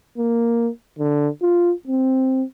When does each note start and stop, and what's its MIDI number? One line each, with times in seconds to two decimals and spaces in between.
0.18 0.69 58
0.99 1.28 50
1.42 1.73 65
1.87 2.44 60